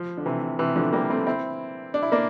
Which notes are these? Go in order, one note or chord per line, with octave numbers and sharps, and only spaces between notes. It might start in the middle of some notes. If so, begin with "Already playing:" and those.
Already playing: F3
D3
C3 E3
C3 E3
D3 F3
G3 A#3
A3 C4
C4 E4
D4
E4
A#3 D4